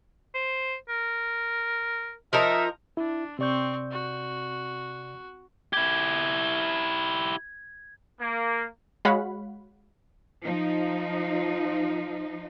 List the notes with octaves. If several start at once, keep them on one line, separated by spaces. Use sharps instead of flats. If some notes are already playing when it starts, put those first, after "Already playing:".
C5
A#4
F3 D#4 A#4 E5
D4 E4
C3 C4 D5 C#6 G6
F#4
E4 G4 G#6
A#3
G#3 F#4 C#5 F5 F#5 B5
F3 D#4